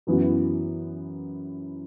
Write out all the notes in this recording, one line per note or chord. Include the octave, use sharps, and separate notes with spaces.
F#2 E3 B3 F#4